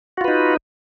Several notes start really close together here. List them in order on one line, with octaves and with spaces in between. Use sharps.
F#4 F4 B4 D#4